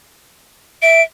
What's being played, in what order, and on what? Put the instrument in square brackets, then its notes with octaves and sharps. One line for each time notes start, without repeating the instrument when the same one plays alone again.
[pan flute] E5 [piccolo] D7